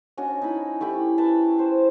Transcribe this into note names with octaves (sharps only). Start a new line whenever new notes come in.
C#4 D4 F#4 D#5
D#4 E4 D#5 B5
A3 E4 G4 B5
B4 E5 A5
C5